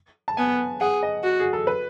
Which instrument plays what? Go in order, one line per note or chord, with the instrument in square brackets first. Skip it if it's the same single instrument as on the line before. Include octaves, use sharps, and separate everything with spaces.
[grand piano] A5
[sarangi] B3 [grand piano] G#5
[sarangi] G#4 [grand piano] F#5
[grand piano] D#5
[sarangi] F#4
[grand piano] G#4
A4
B4